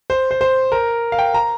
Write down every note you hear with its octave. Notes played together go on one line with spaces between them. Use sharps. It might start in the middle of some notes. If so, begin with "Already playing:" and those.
C5
C5
C5
A#4
F5
G5
A#5